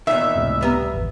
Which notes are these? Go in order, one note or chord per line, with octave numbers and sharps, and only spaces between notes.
E2 A#2 D#3 E5
C#2 A2 C3
G3 B3 A#5
G#1 E2